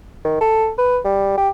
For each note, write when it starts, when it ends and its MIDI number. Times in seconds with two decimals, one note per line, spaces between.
0.25 0.39 51
0.41 0.70 69
0.78 0.99 71
1.05 1.35 55
1.37 1.50 67